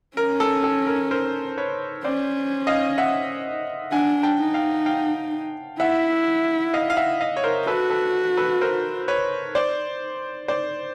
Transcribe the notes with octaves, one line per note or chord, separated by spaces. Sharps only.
C#4 A#4
A4
A4
A#4
A#4 C5
B4 C#5
C#4 C5 D5
D#5 F5
E5 F#5
D4 F#5 G#5
G5 A5
D#4
F5 G5
F5 G5
E4 E5 F#5
D#5 F5
F5
E5 F#5
D#5 F5
C#5
A#4 C5
F#4 A4 B4
A4 B4
A4 B4
A#4 C5
B4 C#5
C5 D5
C5 D5